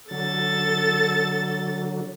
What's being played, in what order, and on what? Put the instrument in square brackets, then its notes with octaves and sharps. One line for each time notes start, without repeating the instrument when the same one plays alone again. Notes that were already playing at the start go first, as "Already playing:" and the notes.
[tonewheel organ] D3 F#3 [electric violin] A4 A6